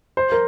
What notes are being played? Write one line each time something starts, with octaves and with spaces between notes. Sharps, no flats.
C5
A#4